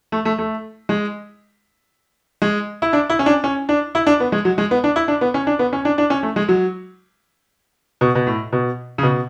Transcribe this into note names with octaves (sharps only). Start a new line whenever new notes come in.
A3
A3
A3
G#3
G#3
E4
D4
E4
C#4
D4
C#4
D4
E4
D4
B3
G#3
F#3
G#3
B3
D4
E4
D4
B3
C#4
D4
B3
C#4
D4
D4
C#4
A3
G#3
F#3
B2
B2
A2
B2
C#3
B2